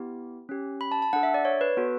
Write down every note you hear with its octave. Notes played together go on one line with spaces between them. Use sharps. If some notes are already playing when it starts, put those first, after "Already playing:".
Already playing: B3 E4 G4
C#4 G4
B5
A5
A5
D4 A4 F#5
E5
D5
C#5
B4
B3 F#4 A4